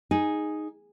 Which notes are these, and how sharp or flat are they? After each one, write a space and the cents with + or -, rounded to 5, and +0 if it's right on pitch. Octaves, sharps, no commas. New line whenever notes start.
D#4 +0 G#4 +0